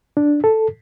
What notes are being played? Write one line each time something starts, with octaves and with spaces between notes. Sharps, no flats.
D4
A4